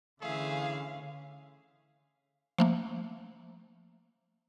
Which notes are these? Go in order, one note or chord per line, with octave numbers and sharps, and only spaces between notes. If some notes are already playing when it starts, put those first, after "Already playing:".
D3 E3 A3 C#4 G#4 E5 F5
F3 A3 A#3